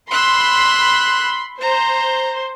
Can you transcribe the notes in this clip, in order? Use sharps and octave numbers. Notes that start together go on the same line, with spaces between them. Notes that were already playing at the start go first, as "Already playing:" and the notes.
B5 C6 E6 F#6
C5 A#5